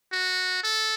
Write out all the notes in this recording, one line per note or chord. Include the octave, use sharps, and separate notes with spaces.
F#4
A4